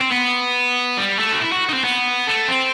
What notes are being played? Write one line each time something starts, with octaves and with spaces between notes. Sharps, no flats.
C4
B3
G3
A3
F#4
E4
F#4
D#4
C4
B3
A3
C4